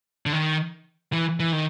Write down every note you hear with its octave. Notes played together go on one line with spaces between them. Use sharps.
D3
D#3
E3
E3
D#3